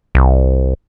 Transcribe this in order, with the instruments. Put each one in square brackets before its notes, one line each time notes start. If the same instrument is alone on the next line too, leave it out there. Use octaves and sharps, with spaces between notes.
[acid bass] C2